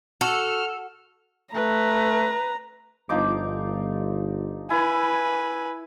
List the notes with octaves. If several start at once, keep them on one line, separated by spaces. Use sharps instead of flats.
F#4 A4 F6
A3 B4 A#5
G1 F3 D#4 D6
E4 B4 G#5